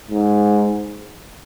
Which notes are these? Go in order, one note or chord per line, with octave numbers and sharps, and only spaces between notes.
G#2